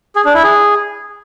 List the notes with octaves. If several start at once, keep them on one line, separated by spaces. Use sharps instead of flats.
G#4
D4
E4
G#4